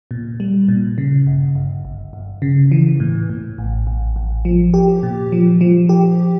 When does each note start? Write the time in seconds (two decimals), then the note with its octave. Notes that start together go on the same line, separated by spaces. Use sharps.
0.11 A#2
0.40 G3
0.68 A#2
0.98 C#3
1.27 G1
1.55 G1
1.85 G1
2.13 G1
2.42 C#3
2.71 E3
3.00 A2
3.29 A2
3.58 A1
3.87 A1
4.16 A1
4.45 F3
4.74 G4
5.03 A#2
5.32 F3
5.61 F3
5.89 G4